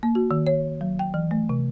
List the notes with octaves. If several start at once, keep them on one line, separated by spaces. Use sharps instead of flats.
A#3
F#4
D#3
C#5
F#3
G5
E3
A3
C3